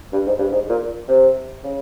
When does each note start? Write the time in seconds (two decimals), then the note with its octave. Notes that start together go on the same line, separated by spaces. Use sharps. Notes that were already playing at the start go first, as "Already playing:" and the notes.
0.12 G2
0.26 G#2
0.39 G2
0.51 G#2
0.69 A#2
1.08 C3
1.64 C#3